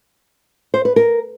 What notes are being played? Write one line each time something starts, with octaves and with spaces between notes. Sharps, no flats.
C5
B4
A#4